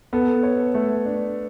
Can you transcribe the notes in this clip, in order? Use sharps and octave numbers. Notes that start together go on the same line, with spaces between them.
B3 A4
C#5
A3
D4